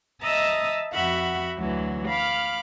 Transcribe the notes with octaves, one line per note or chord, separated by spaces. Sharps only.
D#5 E5 A5 A#5 D#6 E6
F2 F#4 E5 F#5 B5
D2 E3 F#3
F5 B5 D6 F6